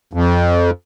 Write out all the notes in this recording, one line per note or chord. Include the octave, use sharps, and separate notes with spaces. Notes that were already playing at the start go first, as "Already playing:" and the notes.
F2